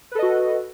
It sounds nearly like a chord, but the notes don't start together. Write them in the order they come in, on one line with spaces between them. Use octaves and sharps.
B4 A4 D#5 F#4